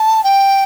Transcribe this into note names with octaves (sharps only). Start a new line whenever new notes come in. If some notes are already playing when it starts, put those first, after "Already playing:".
Already playing: A5
G5